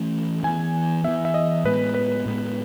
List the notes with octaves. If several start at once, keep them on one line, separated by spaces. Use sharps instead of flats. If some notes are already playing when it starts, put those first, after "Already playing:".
Already playing: E3 A3 C#4
E3 B3 G#5
E3 B3 E5
E5
D#5
A2 G#3 B3 B4
B4
A2 G#3 B3